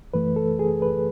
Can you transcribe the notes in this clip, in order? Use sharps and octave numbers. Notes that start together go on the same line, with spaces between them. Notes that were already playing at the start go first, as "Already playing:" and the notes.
F#2 E3 A3 B4
A4
G#4
B4